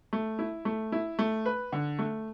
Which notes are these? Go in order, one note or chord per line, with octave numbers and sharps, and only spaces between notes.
A3
E4
A3
E4
A3
B4
D3
A3